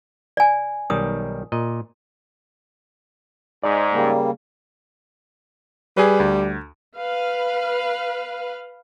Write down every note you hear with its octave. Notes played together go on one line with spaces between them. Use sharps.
D5 G#5
B1 D#3 G3 D#6
A#2 D#5
G#2 D5 A#5
C#3 G3 A#3
G3 G#4 B4
D2
B4 F5